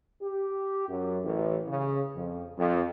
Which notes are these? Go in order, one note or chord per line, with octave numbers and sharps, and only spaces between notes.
G4
F#2
A1
C#3
F2
F2